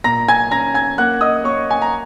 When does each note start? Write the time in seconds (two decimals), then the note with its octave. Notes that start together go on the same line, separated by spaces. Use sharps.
0.04 A#2 A#5 A#6
0.28 G#5 G#6
0.51 C#4 A#5 A#6
0.74 G#5 G#6
0.98 A#3 F#5 F#6
1.21 D#5 D#6
1.44 A#3 C#5 C#6
1.71 G#5
1.82 A#5